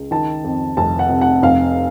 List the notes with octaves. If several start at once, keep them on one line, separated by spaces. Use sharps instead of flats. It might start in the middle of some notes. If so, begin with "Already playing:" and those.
Already playing: C#2
D#3 A5
F2
F1 A5
F#5
C3
F#5
F1 F5